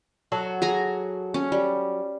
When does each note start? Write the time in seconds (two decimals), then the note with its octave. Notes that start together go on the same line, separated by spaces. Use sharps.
0.32 F#3 F#4 A4
0.62 G#4 G#5 A#5
1.34 C#4
1.52 G3